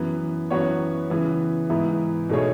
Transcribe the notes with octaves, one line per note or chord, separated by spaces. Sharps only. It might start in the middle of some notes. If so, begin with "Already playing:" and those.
Already playing: F#2 E3 B3
F#2 E3 B3 F#4 C#5
C#3 E3 B3
G#2 E3 B3 E4
B2 A3 D#4 G#4 C#5